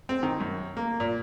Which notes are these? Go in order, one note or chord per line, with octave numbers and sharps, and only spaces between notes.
C4
D#3
F#2
A#3
A#2